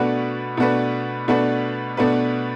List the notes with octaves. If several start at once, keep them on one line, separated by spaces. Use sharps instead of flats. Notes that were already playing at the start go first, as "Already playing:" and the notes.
Already playing: B2 A3 D4 F#4 B4
B2 A3 D4 F#4 B4
B2 A3 D4 F#4 B4
B2 A3 D4 F#4 B4